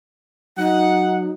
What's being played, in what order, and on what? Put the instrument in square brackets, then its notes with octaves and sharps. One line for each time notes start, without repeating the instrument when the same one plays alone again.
[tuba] F#3 [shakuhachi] D#4 [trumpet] F#5